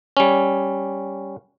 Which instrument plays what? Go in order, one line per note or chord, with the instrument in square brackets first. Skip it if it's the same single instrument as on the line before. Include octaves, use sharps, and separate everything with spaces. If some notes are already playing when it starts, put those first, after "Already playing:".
[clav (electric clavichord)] G3 C#4